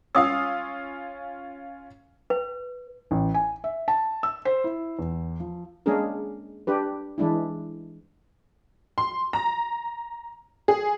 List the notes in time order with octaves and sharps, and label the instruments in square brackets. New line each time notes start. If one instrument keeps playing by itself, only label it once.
[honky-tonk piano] C#4 F4 F5 [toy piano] D#6 E6
[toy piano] B4
[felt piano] A1
G#5
E5
A5
E6
C5
E4
E2
F3
[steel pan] G#3 A#3 C#4 D4 G#4 A#4
D4 G4 B4
E3 G#3 D4 E4
[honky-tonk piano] C6
A#5
G#4